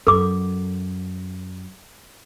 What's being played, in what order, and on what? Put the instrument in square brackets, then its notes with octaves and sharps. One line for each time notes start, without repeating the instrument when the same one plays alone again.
[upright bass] F#2 [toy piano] A4 D6